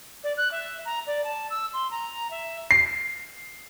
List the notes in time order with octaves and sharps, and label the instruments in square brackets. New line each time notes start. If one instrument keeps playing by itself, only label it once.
[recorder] D5
F#6
E5
A#5
D5
A5
E6
C6
A#5
E5
[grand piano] C7